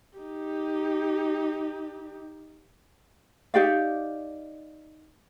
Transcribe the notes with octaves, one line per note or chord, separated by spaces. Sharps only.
D#4 G4
D#4 G4 D5 F5